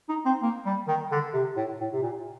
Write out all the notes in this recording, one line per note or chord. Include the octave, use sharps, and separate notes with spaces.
D#4
C4
A#3
G3
D#3
D3
C3
A2
A2
C3
A#2